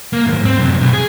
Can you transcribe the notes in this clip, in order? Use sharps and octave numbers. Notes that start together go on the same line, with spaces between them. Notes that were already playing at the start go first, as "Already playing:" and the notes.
A#3
D#2 G#2
C4
F#2 C3
B1
G#4